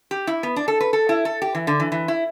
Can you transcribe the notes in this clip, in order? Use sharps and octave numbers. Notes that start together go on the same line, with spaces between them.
G4
E4
B3
D4
A4
B4
A4
E4
A4
G4
E3
D3
E3
E3
E4